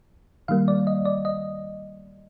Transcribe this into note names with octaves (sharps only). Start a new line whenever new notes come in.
D#3 G3 A#3 F5
D5
D#5
D5
D#5